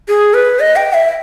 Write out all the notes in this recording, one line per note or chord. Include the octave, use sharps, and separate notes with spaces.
G#4
B4
D#5
G5
E5